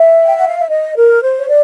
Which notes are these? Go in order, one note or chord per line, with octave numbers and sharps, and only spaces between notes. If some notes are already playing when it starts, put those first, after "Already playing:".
Already playing: E5
G5
F#5
F5
E5
D#5
A#4
C5
C#5
D5